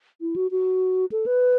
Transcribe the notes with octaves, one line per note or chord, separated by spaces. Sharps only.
E4
F#4
F#4
A4
B4